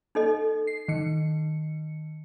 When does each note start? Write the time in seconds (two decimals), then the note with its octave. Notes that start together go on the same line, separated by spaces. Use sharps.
0.15 D#4 A4 D#5
0.67 C7
0.88 D#3 C#7